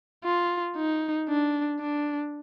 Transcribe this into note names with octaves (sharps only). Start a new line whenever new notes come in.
F4
D#4
D4
D4